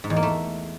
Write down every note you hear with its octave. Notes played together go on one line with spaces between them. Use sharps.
G#2
E2
A#3
A3